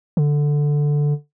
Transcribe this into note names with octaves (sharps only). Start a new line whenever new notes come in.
D3